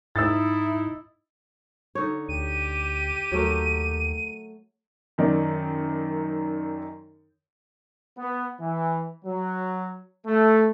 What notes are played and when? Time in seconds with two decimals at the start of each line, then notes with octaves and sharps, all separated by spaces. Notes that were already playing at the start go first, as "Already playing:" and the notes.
0.16 G#2 D#4 E4 E6 A6
1.95 D3 D#4 C#5
2.29 D2 G4 D#7
3.32 D#2 F#3 A3 A#4
5.18 F#2 D#3 D#4 D5
8.18 B3
8.60 E3
9.25 F#3
10.27 A3